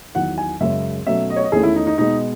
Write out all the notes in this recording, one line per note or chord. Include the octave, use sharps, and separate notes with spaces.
E2 D#3 F#3 F#5
G#5
F#2 C#3 G#3 C#4 E5
B2 F#3 A3 C#4 E5
D#5
C#5
D#5
E2 D#3 A3 C#4 G#4
E4
D#4
D#4
B2 G#3 B3 D#4